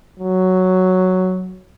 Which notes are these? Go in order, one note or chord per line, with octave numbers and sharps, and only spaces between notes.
F#3